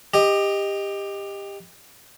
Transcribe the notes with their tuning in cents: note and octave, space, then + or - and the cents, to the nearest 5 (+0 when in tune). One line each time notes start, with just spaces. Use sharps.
G4 +20 D#5 +0